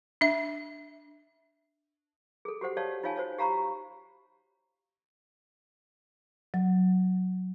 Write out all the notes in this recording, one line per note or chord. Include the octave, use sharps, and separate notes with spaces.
D4 E5
G#4 A4
F#4 G4 C5 F#5
G4 C#5 D5 F5 A5
D#4 F4 C#5 F5 G#5 A5
F#4 C5 C#5 F5
G4 F5 A#5 B5 C#6
F#3